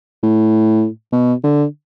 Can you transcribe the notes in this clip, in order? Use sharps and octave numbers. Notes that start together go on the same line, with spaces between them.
A2
B2
D3